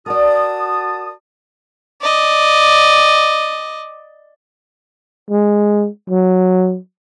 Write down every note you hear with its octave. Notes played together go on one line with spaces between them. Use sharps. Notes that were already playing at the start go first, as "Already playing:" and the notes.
F#4 A#4 D5 A5 D#6
D5 D#5
G#3
F#3